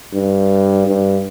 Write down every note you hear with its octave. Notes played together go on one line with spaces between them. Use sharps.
G2
G2